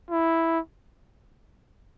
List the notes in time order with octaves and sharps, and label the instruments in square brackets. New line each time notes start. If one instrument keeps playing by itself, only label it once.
[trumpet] E4